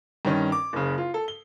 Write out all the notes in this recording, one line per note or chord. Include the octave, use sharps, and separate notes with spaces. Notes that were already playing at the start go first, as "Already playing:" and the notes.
G2 D#3 C#4
D6
F#1 C#3
F4
A4
G7